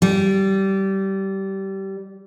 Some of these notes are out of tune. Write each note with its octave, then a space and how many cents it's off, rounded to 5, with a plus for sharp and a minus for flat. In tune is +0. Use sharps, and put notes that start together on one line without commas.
G3 -20